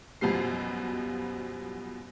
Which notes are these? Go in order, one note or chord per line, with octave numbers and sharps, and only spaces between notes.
F#2 B2 F3 G3 C7